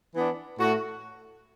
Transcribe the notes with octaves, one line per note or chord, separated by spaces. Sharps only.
E3 B3 D4
A2 A3 F#4